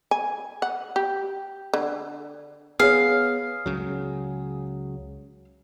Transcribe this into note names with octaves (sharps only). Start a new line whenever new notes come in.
G#5
F#5
G4
D3
B3 G#4 C#5 F5
C#2 C#3 F#3